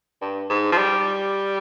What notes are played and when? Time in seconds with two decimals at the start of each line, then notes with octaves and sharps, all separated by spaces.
0.22 G2
0.50 G#2
0.72 F3
0.78 G3